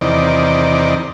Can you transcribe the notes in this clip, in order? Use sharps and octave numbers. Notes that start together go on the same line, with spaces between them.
E2 C3 D#3 D5